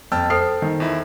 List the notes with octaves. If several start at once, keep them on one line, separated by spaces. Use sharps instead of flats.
F2 G5 A5 E6 F6
A4 C5 C7
D#3
E2 E4